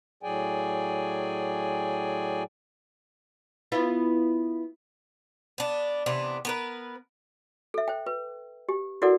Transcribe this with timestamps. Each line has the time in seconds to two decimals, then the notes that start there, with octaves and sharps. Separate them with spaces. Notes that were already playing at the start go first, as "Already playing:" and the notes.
0.23 A2 F#3 G#4 D5 G5 G#5
3.72 B3 E4 F4
5.58 B3 D4
6.06 C3 E3 B3 D4
6.45 B3 A#4 B4
7.74 A4 E5
7.88 C5 G5
8.06 B4
8.69 G4
9.02 E4 F#4 A4 A#4 D5 F#5